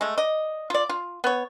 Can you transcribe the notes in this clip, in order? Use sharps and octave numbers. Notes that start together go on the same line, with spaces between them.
G#3 A3
D5 D#5
F4 D5
F4
B3 C#5